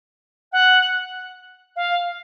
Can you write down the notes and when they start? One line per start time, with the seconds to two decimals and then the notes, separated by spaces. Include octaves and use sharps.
0.52 F#5
1.76 F5